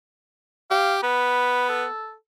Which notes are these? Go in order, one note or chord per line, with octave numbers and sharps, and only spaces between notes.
G4 F5
B3 B5
A4